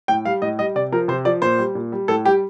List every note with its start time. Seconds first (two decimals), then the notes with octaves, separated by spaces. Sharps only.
0.08 A2 G5
0.25 G3 F5
0.42 A2 D#5
0.59 G3 D#5
0.75 C3 D5
0.92 F3 A#4
1.08 C3 C5
1.25 F3 D5
1.42 A#2 C5
1.58 G3
1.75 A#2
1.92 G3
2.08 A2 A4
2.25 G3 G4